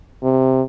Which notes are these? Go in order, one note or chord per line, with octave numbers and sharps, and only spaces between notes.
C3